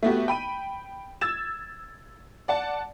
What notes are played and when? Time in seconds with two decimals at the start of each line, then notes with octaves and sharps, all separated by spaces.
0.03 A3 B3 F#4 G4
0.28 G5 B5 D#7
1.21 E6 G#6 A6 E7
2.48 D5 F#5 A5